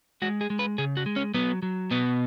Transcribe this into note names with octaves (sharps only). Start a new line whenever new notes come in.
G#3 F#4
G#4
G#3
B4
C#3 G#4
F#4
G#3
C#4
F#3 B3
F#3
B2 B3